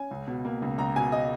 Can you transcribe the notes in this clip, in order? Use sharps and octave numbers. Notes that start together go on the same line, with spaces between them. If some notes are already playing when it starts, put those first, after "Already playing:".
Already playing: C#4 G#5
C#2
B2
A#3
C#2
C#2 A#5
B2 G#5
D#5